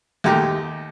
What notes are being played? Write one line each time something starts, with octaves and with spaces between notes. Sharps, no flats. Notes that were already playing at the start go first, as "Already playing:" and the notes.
D#2 G#3 A3 G4 A#5